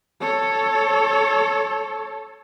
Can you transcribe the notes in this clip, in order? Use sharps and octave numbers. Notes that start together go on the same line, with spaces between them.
A4 C#5